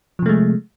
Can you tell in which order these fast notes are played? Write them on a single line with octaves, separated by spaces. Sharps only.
F3 C3 A3 G#3